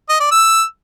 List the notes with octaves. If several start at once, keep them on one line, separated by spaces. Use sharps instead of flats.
D#5
D5
E6